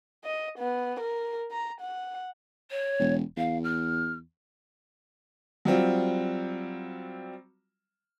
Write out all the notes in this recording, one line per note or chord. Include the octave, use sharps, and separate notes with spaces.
D#5
B3
A#4
A#5
F#5
C#5
E1
E2 F5
F6
F#3 G3 C4 F4